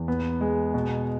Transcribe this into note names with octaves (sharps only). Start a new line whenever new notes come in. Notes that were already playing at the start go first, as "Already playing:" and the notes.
Already playing: E2
B3
G#3
B2